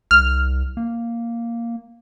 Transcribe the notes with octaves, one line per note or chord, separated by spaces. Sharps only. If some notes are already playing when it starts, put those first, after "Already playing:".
C2 F6
A#3